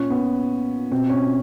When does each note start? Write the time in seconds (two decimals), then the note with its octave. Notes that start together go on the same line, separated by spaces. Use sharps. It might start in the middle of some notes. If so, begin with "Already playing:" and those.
Already playing: A#2 C#4
0.10 B3
0.91 B2 C4
1.09 C#4